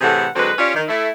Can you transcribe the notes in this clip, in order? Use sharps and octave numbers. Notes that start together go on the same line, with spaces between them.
A2 C3 E3 G#4 A4 F#5
D3 F#3 G#3 C4 B4
C#4 F4 G4 C#5 D5
D#3
A3 E4